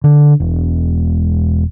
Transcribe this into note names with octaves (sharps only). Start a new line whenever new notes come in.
D3
E1